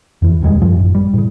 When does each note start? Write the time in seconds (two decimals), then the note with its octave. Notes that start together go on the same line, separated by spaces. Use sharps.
0.22 F2 E3
0.41 E1 D#2 G3 G#3
0.62 F#2 F3
0.77 A1 F#2
0.95 G3
1.14 A2 C#3